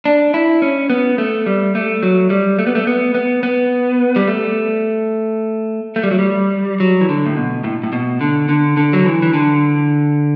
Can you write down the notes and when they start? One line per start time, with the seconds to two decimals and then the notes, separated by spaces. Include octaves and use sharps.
0.05 D4
0.34 E4
0.62 C#4
0.90 B3
1.18 A3
1.46 G3
1.75 A3
2.03 F#3
2.30 G3
2.59 A3
2.67 B3
2.75 A3
2.87 B3
3.14 B3
3.43 B3
4.16 G3
4.28 A3
5.96 A3
6.04 G3
6.11 F#3
6.19 G3
6.80 F#3
7.01 E3
7.09 D3
7.26 A2
7.37 B2
7.64 A2
7.83 A2
7.93 B2
8.21 D3
8.49 D3
8.77 D3
8.93 F#3
9.05 E3
9.22 E3
9.34 D3